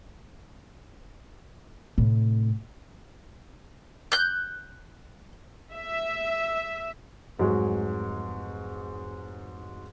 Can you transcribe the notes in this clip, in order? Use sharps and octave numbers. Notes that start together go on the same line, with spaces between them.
A2 C3
F#6 G6
E5
F1 G#2 F#3 G#3 F#4